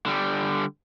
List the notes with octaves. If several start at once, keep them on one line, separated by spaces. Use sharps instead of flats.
D3 G3